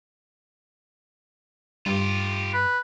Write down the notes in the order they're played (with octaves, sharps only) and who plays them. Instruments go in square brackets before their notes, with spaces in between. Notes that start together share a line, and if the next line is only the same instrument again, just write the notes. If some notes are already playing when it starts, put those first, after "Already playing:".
[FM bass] G2 [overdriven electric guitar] F4 G4
[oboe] B4